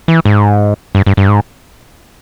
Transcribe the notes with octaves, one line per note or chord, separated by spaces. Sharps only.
E3
G#2
G2
G2
G2
G#2